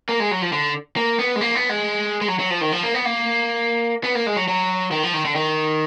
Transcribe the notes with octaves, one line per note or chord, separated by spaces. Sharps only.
A#3
G#3
F#3
F3
D3
A#3
B3
G#3
A#3
B3
G#3
G#3
F#3
F#3
F3
D#3
F3
A#3
B3
A#3
B3
A#3
G#3
F#3
F#3
D#3
F3
D#3
D3
D#3